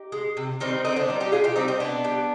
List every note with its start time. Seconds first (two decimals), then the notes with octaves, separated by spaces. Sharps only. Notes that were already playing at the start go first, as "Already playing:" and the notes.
Already playing: D#4 G4
0.12 G#3
0.37 C3
0.60 D#3 G3 C4 D#4
0.85 D3 C4 D#4
0.96 B3 D4
1.08 G3 C4 D#4
1.20 D#4 G4
1.32 B2 F4 G#4
1.44 D#4 G4
1.56 G3 C4 D#4
1.68 C4 D#4
1.80 B2 B3 D4
2.04 G3